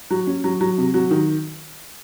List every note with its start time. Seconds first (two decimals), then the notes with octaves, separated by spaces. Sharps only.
0.10 F#3
0.27 C#4
0.44 F#3
0.61 F#3
0.78 C3
0.94 F#3
1.11 D#3